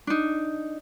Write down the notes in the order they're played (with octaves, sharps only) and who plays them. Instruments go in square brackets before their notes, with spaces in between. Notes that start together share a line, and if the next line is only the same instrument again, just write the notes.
[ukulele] D4 D#4